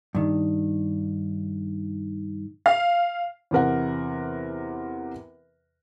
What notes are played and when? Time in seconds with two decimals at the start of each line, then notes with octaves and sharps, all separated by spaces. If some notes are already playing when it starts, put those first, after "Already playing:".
0.15 G2 D#3
2.66 F5
3.51 E2 C3 A#4 F#5